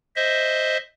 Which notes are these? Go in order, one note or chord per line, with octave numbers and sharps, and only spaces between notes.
C5 D#5 E5